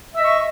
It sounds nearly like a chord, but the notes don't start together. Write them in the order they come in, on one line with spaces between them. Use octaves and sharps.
E5 D#5 C#6